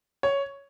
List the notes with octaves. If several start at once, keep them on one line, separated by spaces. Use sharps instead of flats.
C#5